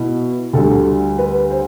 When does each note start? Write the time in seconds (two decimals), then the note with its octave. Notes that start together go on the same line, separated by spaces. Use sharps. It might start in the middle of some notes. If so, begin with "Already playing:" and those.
Already playing: B2 E4
0.53 D2 D3 G3 A4
1.18 B4
1.51 C5